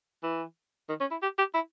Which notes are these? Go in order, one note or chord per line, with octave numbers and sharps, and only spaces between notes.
E3
D#3
C#4
E4
G4
G4
E4